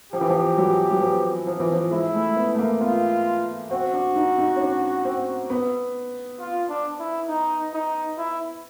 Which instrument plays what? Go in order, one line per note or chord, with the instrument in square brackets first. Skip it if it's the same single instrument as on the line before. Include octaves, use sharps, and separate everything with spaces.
[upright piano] F3 [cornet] G4
[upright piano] E3
F3
F#3
F#3
F3
F3
E3
F3
[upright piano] G#3 [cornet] E4
[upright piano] A3
B3
A3
A#3
[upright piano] B3 [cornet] F4
[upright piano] C4 [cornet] F#4
[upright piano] D4
D#4
D#4
C#4
D4
C4
B3
[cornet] F4
D4
E4
D#4
D#4
E4